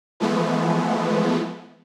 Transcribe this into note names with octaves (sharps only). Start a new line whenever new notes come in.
E3 F3 G#3 A3 B3